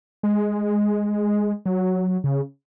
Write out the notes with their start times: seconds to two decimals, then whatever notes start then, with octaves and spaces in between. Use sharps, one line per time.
0.23 G#3
1.66 F#3
2.24 C#3